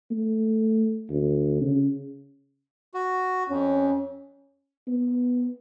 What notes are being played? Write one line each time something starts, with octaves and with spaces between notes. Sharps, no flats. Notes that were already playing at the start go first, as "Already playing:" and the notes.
A3
D2
C#3
F#4
F2 C#4
B3